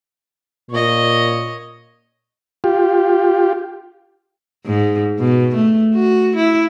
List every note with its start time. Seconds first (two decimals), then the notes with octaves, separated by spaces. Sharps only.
0.71 A#2 C#5 D#5
2.64 F4 G4
4.66 G#2
5.19 B2
5.55 A3
5.94 F#4
6.36 E4